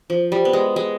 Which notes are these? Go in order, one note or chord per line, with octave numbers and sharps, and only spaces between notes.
F3
G3
B3
G#3
G#3